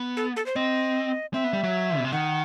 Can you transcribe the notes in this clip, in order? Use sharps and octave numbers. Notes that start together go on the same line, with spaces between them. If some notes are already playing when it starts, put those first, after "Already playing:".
Already playing: B3
A4
A4
C5
C4 D#5
C4 E5
B3
G3
F#3
B2
C3
D#3 F#5